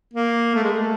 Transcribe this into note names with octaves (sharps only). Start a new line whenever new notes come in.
A#3
A3
G#3
A3